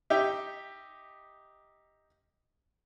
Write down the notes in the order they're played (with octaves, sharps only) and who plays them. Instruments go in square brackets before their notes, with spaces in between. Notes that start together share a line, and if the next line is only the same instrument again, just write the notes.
[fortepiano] D#4 G4 E5 G5